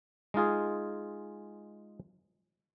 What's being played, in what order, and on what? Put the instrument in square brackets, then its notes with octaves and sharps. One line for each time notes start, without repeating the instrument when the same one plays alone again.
[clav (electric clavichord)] G#3 D#4 F4 G#4